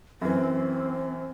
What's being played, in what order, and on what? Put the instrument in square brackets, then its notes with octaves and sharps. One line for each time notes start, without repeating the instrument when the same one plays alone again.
[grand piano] F#2 E3 [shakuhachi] C4